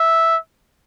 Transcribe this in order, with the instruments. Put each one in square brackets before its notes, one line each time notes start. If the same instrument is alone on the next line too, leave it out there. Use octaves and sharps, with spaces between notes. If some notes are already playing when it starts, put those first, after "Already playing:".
Already playing: [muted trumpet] E5